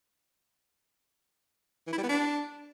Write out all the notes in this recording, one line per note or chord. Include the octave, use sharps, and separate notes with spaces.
E3
E4
G3
B3
D4